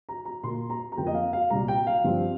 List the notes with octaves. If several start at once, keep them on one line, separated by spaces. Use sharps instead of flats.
A#5
A#5
A#2 A#3 C6
A#5
A#5
F2 F3 A#3 G5
D#5
F5
F5
C2 A#2 G3 A#5
G5
F5
G2 F3 C4